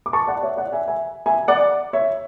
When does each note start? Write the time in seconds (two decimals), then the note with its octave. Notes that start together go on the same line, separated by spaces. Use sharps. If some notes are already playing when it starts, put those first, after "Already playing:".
0.06 D6
0.13 A5 C#6
0.28 D5 F#5
0.43 C#5 E5
0.57 D5 F#5
0.72 E5 G#5
0.88 E5 G#5
1.26 E5 G#5
1.48 D5 F#5
1.93 C#5 E5